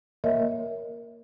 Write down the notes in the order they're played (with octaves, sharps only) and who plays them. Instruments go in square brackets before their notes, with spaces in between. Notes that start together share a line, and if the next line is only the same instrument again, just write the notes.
[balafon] A#3 A#4 C#5 D#5 E5